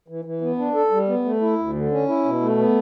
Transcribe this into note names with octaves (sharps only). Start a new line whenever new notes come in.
E3
E3
B3
D4
A4
G3
B3
A3
E4
D2
D3
C#4
E4
B2
A3
B3